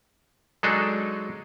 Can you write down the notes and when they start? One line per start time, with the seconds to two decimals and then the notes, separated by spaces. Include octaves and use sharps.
0.63 F#3 G#3 D4 D#4 G#4 A4